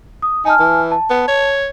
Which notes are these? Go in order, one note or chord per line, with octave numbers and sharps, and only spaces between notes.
D#6
D#4 G#5 A5 F6
E3
A5
B3
C#5